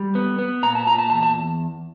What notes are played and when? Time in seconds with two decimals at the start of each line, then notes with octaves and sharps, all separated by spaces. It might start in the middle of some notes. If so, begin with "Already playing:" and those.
Already playing: G3
0.15 B3
0.39 B3
0.63 A#2 A#5
0.75 A5
0.87 A#2 A#5
0.98 A5
1.10 E2 A5
1.23 A5